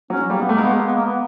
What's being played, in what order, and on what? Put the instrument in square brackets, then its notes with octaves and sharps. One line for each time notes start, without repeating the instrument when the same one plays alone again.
[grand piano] F#3 [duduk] C#4
[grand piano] G3 [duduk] A#3
[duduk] B3
[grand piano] A3 [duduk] A#3
[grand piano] G#3 [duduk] B3
[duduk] A#3
B3
A#3
B3